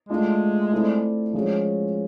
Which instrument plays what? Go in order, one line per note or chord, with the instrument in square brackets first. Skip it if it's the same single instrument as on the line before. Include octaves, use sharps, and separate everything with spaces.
[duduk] G#3 [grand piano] A3 D4 F4
[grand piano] A3 C4 E4 A4 D5
F3 G#3 C#4 F#4